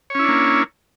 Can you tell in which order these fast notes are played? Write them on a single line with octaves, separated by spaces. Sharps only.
C#5 C#4 E4 D4 A#3